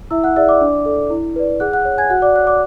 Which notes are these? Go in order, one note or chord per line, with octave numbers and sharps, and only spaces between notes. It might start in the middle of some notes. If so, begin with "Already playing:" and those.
E4 E5 E6
F#5 F#6
G#4 D5 E5 E6
D5 D6
D4
A4 D5
E4
B4 D5
G#4 F#5 F#6
F#5 F#6
C#5
G#5 G#6
F#4 F#5 F#6
D5 D6
C#5 F#5 F#6
D5 D6